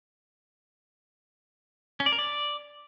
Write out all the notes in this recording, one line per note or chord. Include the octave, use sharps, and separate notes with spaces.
C#4
D5
A#4
D5